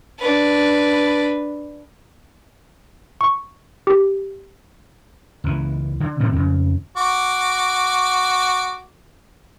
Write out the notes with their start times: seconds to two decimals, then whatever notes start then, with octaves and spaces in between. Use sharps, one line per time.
0.18 D4 B4
3.21 C#6
3.87 G4
5.44 C#2 E3
6.00 D3
6.19 A2 C3 D#3 C4
6.33 F2 C#3
6.97 F#4 D6